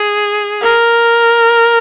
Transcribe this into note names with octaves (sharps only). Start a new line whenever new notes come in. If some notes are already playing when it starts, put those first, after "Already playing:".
Already playing: G#4
A#4